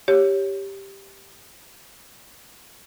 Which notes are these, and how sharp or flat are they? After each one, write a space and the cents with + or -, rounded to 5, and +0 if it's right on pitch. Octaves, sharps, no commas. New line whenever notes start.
G4 +0 C#5 +0